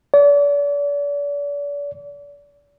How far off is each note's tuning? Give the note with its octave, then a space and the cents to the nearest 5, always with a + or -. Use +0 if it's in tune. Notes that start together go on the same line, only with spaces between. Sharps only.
D5 -40